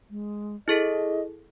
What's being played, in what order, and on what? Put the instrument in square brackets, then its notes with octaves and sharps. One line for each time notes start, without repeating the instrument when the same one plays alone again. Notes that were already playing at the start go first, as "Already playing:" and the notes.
[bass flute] G#3
[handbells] E4 G#4 A4 [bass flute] D#5